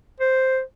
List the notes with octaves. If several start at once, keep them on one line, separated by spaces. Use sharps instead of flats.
C5